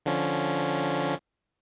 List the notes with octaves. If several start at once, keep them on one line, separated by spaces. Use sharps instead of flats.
D3 F3 C#4